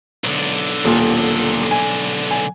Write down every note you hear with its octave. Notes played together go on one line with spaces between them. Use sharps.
B1 D3
D#1 A#2
G#5
G#5